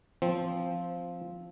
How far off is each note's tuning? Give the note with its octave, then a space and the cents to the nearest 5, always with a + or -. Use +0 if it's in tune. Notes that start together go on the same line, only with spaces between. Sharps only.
F3 +0 C4 +0